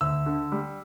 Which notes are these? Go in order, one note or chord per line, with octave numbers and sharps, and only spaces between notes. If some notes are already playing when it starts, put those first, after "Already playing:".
D2 E6
D3
G3